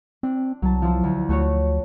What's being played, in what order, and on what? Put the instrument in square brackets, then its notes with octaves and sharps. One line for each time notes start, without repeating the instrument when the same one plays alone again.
[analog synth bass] C4 [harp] D4
[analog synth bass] C2 [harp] F#3 A5
[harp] F3 E4 C5
D2
[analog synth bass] D2 [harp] A3 F#4 C#5